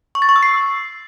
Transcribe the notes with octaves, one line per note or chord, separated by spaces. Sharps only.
C#6
A6
C#6
E6
C7